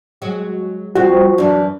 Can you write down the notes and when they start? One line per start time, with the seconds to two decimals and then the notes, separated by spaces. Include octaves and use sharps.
0.22 F#3 G#3 F#4
0.95 F3 G3 C4 F#4
1.38 F#2 E3 D4